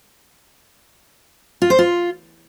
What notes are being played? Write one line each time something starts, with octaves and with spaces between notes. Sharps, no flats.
F4
C5
F4